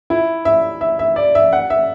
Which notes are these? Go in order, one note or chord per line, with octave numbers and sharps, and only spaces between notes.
E4
E5
E5
E5
D5
E5
F#5
E5